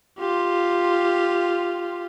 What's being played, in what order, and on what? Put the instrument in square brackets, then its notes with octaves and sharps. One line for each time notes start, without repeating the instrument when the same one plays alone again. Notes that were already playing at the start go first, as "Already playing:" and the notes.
[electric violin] F4 G4